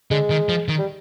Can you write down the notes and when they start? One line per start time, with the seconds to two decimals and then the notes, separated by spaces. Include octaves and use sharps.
0.11 D3 G#3
0.30 D#3
0.49 F3
0.68 D#3
0.78 G3